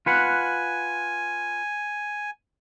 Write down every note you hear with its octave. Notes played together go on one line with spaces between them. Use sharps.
F4 B4 F#5 G#5